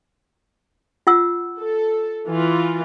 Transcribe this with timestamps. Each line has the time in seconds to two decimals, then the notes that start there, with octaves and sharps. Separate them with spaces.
1.07 F4 F#5 E6
1.60 A4
2.27 E3 F4